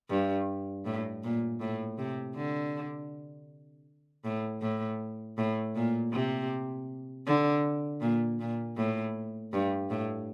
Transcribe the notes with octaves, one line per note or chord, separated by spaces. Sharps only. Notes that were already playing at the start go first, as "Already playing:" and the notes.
G2
A2
A#2
A2
C3
D3
A2
A2
A2
A#2
C3
D3
A#2
A#2
A2
G2
A2